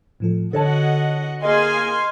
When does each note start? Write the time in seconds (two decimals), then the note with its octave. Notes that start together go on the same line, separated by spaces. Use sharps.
0.20 A2 F3 A4
0.53 D3 F#4 A4 C#5 D#5 F#5 A5
1.43 A#3 G#4 D#5 F5 G#5 C6